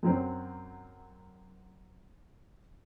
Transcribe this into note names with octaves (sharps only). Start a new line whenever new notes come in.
F#2 F#3 C4